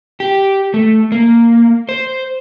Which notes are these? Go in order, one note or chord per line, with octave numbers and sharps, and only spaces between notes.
G4
A3
A#3
C5